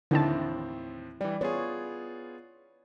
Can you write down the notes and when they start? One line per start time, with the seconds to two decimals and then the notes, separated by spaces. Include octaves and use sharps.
0.11 D#2 A2 D3 D#3 C4 E4 A5
1.21 E3 G3 D5
1.41 B3 F4 G#4 C#5